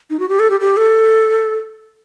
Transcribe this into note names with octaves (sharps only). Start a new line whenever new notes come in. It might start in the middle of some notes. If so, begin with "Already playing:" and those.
D#4
F#4
G4
A4
G4
G4
A4